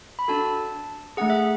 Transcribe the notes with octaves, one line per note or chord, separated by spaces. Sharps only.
B5
D4 F#4 A4 A5
A3 D4 G#4 F#5
E5